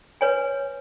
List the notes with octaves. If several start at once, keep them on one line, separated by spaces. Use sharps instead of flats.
B4 C#5 G#5